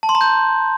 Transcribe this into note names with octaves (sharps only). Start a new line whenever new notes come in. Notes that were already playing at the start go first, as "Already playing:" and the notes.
A5
C6
A#5
G6